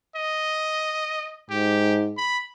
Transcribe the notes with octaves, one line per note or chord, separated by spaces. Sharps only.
D#5
G#2 G4
B5